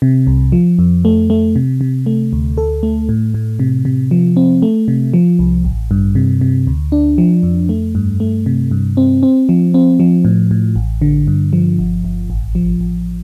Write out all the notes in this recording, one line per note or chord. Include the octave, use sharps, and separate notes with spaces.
C3
C2
F3
F2
A3
A3
C3
C3
A3
D2
A4
A3
A2
A2
C3
C3
F3
C4
A3
C3
F3
C2
A1
G2
C3
C3
D2
D4
F3
F2
A3
G2
A3
C3
G2
C4
C4
F3
C4
F3
A2
A2
A1
D3
G2
F3
G1
G1
A1
F3
A1